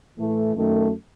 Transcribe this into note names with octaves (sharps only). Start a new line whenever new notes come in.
A2 E3 A3
F#2 D#3 A3